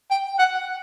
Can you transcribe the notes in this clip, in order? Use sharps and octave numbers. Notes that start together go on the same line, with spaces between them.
G5
F#5